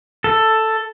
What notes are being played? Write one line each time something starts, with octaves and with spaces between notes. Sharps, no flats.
A4